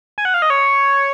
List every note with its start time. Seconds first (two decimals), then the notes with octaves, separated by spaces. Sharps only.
0.18 G#5
0.25 F#5
0.34 F5
0.42 D#5
0.50 C#5